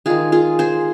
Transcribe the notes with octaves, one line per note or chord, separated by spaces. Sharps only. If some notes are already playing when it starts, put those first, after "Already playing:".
D#3 G#3 F4 G#4
F4 G#4
G#4 C5